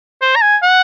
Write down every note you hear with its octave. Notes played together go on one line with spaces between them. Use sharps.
C5
A#5
G#5
F#5